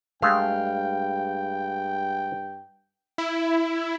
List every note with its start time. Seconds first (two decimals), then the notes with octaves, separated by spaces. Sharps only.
0.22 G2 G#3 A3 F5 G5
3.18 E4